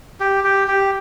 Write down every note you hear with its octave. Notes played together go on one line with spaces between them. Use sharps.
G4
G4
G4